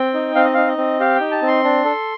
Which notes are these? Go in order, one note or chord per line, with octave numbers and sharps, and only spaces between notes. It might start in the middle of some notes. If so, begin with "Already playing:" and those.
Already playing: C4 G5
D#4
C4 F5
D#5
D#4 F5
D#5
C4
G4 F5
D#4 G5
A5
C4
C6
D4
A4